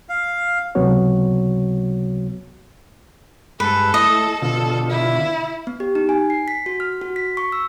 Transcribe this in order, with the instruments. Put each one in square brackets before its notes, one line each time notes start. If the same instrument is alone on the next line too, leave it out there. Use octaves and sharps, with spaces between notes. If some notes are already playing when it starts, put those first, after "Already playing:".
[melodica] F5
[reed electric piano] C#2 C3 F#3 B3 F#4 C#5
[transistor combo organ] G2 G#3 [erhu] A4 [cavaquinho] B4
[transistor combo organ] A3 E4 [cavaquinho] D#5
[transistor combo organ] B2 D3 F4 [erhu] A4
[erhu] E4
[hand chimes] B3
G4
D#4
G#5
C7
B6
F#4
F6
F#4
B6
C#6
E6